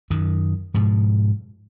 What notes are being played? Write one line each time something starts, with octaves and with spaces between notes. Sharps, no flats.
F#2 D#3
G#2 B2 F3